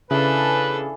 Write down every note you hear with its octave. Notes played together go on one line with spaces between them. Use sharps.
C#3 E3 D4 A4 B4 F5 A5